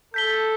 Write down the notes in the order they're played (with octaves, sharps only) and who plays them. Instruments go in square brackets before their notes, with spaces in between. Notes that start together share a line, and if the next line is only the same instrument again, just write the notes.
[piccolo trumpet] A4 [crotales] G6 B6 G7